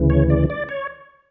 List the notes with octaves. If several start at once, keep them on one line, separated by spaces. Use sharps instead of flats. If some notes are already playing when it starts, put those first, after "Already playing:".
Already playing: D2 C#3 E3
C#5
D5
D5
C#5